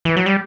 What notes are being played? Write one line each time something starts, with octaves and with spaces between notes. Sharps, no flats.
E3
F#3
G3